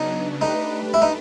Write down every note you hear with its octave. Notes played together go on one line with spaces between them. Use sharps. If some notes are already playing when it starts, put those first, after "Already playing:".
Already playing: C#3 F#3 B3 D4 D#4
A3 D4 D#4 G4 B4
E4
D#4